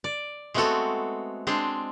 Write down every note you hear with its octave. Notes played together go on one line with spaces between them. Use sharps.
D5
G#3 A3 B3 C4 F#4 A4
G#3 C4 D4 C5